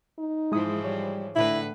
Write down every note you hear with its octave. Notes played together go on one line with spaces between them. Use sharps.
D#4
G#2 E3 F3 G#3 E4 D#6
G3 C#5
A2 D3 E4 B4